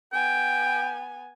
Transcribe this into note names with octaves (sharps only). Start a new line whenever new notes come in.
B3 G5 G#5